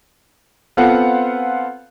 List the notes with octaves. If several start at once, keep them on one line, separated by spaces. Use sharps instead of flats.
B3 C4 F4 A4 F5 F#5